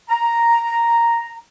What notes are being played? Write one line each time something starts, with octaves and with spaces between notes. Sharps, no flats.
A#5